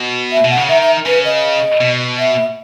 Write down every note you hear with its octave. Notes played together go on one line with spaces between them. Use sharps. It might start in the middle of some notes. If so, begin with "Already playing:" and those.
Already playing: B2
E5
B2
F#5
C#3
D#3 E5
E5
C#3 B4
D#5
B2
E5